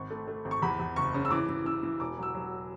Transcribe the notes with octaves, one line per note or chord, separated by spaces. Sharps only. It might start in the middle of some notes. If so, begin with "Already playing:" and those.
Already playing: G#1 C#6
A3
A3
G#1
C#6
E2 B5
E2
F#1 C#6
C#3
E6
E3 D6
E3
E3 E6
E3
E1 D6
F#3 E6
F#3